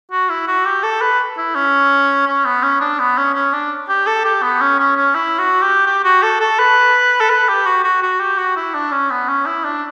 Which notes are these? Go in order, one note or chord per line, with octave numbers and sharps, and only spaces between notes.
F#4
E4
F#4
G4
A4
B4
E4
C#4
C#4
B3
C#4
D4
B3
C#4
C#4
D4
G4
A4
G4
B3
C#4
C#4
C#4
E4
F#4
G4
G4
F#4
A4
A4
B4
A4
B4
G4
F#4
F#4
F#4
G4
F#4
E4
D4
C#4
B3
C#4
E4
D4